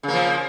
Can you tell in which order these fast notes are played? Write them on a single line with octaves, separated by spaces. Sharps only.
C#3 A#3 F3